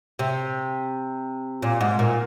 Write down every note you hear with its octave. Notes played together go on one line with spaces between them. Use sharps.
C3
A#2
G#2
A#2